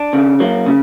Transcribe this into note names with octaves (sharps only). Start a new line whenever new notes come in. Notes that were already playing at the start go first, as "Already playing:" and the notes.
Already playing: D4
C#3
F#3 A#3
C#3